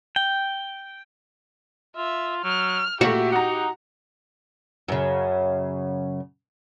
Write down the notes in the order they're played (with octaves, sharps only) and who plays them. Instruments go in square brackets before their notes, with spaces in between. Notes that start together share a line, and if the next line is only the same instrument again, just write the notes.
[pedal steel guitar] G5
[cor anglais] F4 [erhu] E5
[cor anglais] F#3 [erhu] F6
[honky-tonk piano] A#2 A3 [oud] F#4 [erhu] G4 [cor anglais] E5
[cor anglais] D#4 [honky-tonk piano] F#5 A#5
[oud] F#2 C#3